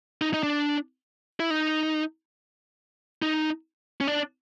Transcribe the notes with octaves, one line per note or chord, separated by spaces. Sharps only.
D#4
D#4
D4
E4
D#4
D#4
C#4
D4